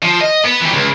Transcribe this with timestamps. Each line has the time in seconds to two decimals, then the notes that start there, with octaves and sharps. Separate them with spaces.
0.03 F3
0.21 D#5
0.45 B3
0.61 E3 G4
0.73 C#2